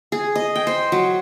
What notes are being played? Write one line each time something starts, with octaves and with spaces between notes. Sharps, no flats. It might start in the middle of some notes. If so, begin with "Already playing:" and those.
G#4
D#5
G5
C5
F#3